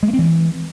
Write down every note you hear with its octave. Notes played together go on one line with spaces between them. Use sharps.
G#3
A#3
C4
E3